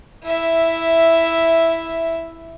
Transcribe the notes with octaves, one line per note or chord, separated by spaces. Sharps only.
E4 E5